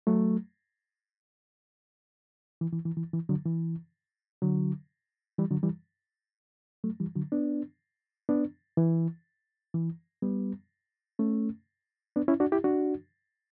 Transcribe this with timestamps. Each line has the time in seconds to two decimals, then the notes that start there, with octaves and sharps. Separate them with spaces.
0.07 F#3 A3
2.61 E3
2.73 E3
2.85 E3
2.97 E3
3.13 E3
3.29 D3 F#3
3.45 E3
4.42 D3 F#3
5.38 E3 G3
5.51 D3 F#3
5.63 E3 G3
6.84 F#3 A3
7.00 E3 G3
7.15 D3 F#3
7.32 B3 D4
8.29 B3 D4
8.77 E3
9.74 E3
10.22 G3 B3
11.19 A3 C#4
12.16 B3 D4
12.28 C#4 E4
12.40 D4 F#4
12.52 E4 G4
12.64 D4 F#4